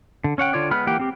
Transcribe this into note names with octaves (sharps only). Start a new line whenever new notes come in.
D3
C#4 C#5 F#5 G5
D3 F4 C#5 D5
G#3 B3 B4 B5 F6
E3 A#3 G4 F#5 G5
C4 G4